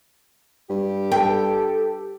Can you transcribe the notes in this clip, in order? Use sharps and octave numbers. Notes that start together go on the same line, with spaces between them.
G2 G4
A4 G5